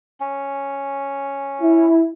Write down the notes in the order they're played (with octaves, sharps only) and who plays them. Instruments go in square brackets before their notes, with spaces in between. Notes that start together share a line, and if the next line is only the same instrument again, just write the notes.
[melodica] C#4
[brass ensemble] E4